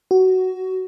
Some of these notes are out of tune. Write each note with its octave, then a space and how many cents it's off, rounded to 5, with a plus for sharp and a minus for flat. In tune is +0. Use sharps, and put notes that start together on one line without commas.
F#4 +15